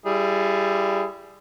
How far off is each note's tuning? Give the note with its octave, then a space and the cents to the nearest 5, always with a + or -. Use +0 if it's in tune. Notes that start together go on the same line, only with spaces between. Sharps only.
G3 +0 E4 +35 G#4 +0